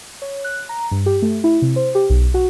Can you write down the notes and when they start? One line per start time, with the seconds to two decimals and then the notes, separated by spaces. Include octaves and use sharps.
0.22 C#5
0.44 F#6
0.69 A#5
0.91 G2
1.06 G4
1.22 A3
1.44 E4
1.62 C3
1.76 C5
1.95 G4
2.10 B1
2.34 F#4